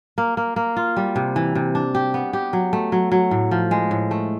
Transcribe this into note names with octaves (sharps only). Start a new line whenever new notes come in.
A#3
A#3
A#3
F4
G3
C3
E3
C3
D4
G4
B3
G4
F#3
A3
F#3
F#3
A2
F3
G#3
A2
A3